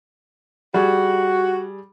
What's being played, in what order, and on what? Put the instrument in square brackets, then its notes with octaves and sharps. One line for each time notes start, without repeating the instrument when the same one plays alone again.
[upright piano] G3 G#4 [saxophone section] F#4